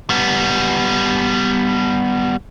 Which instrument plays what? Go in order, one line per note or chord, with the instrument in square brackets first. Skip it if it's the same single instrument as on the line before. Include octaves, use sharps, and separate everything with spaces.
[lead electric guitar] G3 B3